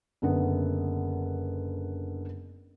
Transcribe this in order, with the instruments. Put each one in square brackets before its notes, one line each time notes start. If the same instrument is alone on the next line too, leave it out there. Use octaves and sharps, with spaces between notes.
[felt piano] F#1 D3 B3